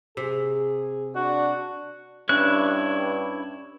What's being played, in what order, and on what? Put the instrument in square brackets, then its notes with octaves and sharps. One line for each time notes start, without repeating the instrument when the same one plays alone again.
[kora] C3 [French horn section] G#4
[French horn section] D4 D5 [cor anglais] F#4
[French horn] G2 [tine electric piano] C#4 D4 [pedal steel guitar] E4 C#5 F#6